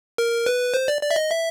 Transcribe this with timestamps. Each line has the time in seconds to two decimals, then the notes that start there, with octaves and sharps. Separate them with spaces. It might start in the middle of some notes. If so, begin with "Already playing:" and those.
0.18 A#4
0.46 B4
0.74 C5
0.88 D5
1.02 D5
1.11 E5
1.16 D#5
1.30 E5